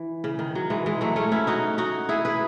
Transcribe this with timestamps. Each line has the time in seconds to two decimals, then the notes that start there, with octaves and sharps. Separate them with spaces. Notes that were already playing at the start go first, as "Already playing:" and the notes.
Already playing: E3
0.24 C#3
0.39 D#3
0.55 F#3
0.70 E3 G#3
0.86 E3 G#3
1.01 F#3 A3
1.16 A3 C#4
1.31 C#4 E4
1.47 D#4 F#4
1.78 D#4 F#4
2.09 E4 G#4
2.25 G#4 B4